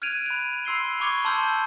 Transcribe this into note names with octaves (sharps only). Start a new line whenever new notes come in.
F6 F#6 G#6 D7 D#7 F7
B5 F#6
B5 C6 E6 C7 G7
B5 C#6 D6 G#6 C#7 G7
A5 C6 E6 F6 G6